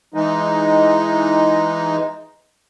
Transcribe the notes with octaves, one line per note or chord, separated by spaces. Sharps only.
E3 G#3 D#4